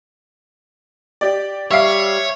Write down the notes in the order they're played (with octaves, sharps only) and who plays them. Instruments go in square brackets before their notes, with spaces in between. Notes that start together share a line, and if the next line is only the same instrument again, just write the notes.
[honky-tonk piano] G4 D5
[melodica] G3 [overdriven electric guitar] C#5 [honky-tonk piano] E5 F5 C7